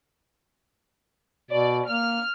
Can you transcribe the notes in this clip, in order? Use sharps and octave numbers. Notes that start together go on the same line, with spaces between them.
B2 D5
A#3 F6